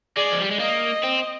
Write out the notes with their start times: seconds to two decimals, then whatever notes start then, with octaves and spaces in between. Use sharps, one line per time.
0.17 G#3 D5
0.33 F3
0.42 G3
0.51 G#3
0.60 A#3 D#5
1.04 C4